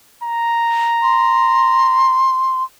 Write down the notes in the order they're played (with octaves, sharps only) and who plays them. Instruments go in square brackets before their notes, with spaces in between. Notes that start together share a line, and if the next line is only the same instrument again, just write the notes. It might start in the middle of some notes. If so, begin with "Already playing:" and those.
[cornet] A#5
[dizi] C6